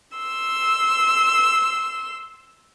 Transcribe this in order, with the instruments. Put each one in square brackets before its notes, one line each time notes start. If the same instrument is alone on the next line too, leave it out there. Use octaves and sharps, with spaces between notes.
[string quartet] C6 E6